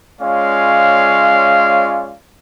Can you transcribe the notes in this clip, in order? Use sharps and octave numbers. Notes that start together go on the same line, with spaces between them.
G#3 C#4 F4 C#5 D5 F5